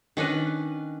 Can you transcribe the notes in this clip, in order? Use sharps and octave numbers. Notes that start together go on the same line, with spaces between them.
D#3 C#4 D4 B4